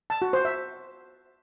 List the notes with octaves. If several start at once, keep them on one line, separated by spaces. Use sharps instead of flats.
A5
F#4
C5
E5